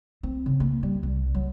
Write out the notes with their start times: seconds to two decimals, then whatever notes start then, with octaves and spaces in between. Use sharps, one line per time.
0.23 C4
0.46 C#3
0.60 A#3
0.83 G3
1.03 C2
1.35 F#3